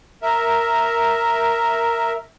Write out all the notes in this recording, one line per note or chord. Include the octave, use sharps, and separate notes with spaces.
A#4 E5